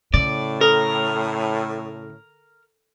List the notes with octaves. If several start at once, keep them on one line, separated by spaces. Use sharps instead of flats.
A2 C#3 D5
A4 A#4